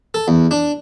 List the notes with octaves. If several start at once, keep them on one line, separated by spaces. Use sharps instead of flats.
A4
E2
D4